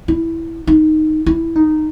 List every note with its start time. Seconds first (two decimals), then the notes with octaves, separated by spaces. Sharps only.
0.08 E4
0.67 D#4
1.26 E4
1.56 D#4